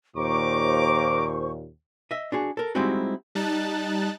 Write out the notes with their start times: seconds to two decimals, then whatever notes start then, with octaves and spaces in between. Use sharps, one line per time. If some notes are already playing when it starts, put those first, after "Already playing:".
0.16 D#2 A#2 C5 A#5 C#6 D6
2.11 D#5 E5
2.32 D4 F#4 G#4
2.57 A4 A#4
2.75 G3 G#3 C4 D#4 E4 F#4
3.35 G3 D#4 A5 F#6 A6